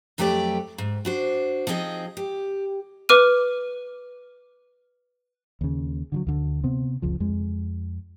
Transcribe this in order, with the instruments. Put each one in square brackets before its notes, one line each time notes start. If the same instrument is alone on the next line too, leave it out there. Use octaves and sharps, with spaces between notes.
[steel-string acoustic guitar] F2 F#3 A3 G4 A4 D5
G#2
D4 F#4 C5
F3 C4 D#4 G#4 D#5
G4
[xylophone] B4 D6 F6 D#7
[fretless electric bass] D#2 C#3
D3 E3 F#3
D2 D3
C3 B3 C4
F#1 C#2 F3
F2 G#3